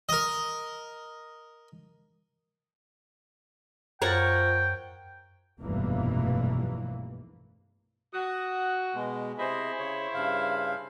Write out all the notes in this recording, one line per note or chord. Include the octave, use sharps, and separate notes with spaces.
A#4 D#5
F#2 F3 A#4 C#5 F#5 G5 A6
F1 B1 G2 E3 A#3
F#4 D#6
B2 G#3
C3 E4 G#4 C5 D#5
C#3 C#5
G2 C#3 F5